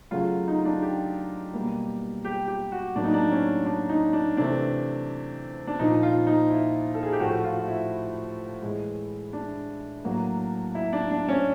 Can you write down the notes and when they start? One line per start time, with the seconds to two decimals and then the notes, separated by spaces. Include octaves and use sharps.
0.11 C#3 F#3 A3 F4
0.48 D#4
0.65 D4
0.82 G4
1.54 B2 G3 A#3
2.25 G4
2.47 G4
2.72 F#4
2.95 A2 F#3 A#3 D4
3.04 D#4
3.14 D4
3.31 C#4
3.66 D4
3.89 D#4
4.13 D4
4.37 C3 E3 A3 D4
5.67 D4
5.79 A#2 F3 A#3 D#4
6.03 F4
6.27 D#4
6.50 E4
6.95 A4
7.03 G#4
7.13 G4
7.20 A2 F3 A3 F#4
7.44 F4
7.60 F4
7.68 E4
8.62 A2 E3 G#3
9.33 D4
10.04 A2 F#3 A#3
10.75 E4
10.93 D4
11.11 D4
11.28 C#4